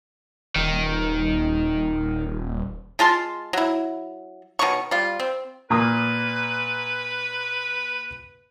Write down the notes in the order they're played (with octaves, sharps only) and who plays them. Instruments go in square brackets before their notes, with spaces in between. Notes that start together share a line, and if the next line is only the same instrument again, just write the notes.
[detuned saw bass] D#1 [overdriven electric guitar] D#3
[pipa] G#3 F4 A5 C6
F#3 E4
B2 D#3 C#5 C#6
G3 F4
C4
[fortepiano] A#2 A#3 D#6 [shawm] B4